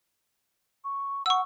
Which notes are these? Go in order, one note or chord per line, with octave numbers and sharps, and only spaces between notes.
C#6
F#5 C#6 E6